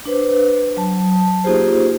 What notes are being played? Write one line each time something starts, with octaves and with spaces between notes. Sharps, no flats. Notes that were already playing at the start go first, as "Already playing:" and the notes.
D4 B4 C5
F#3 A5
A#3 D#4 F4 G4 G#4 C5